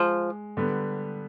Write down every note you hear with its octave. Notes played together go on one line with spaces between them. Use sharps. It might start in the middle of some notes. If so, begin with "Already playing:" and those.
Already playing: F3 G#3
D3 G3 B3